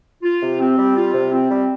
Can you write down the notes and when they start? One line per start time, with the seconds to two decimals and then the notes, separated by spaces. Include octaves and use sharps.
0.22 F4
0.41 C3
0.59 C4
0.77 G3
0.95 F4
1.14 C3
1.32 C4
1.50 G3